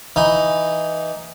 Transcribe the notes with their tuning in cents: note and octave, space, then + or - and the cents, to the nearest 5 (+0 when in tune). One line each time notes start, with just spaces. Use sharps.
E3 +0 D#4 +0